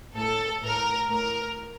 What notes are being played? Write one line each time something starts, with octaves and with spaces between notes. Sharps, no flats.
A2 A4
A2 A#4
A2 A#4